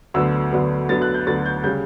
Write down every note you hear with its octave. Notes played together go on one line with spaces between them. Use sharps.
D2 D3 F#3 B3 E6
D2 D3 F#3 B3
D2 D3 F#3 B3 A6
F#6
G6
D2 D3 F#3 B3 A6
G6
C#3 G3 G6